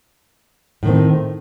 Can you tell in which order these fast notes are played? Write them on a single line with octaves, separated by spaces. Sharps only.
A2 D#3 C4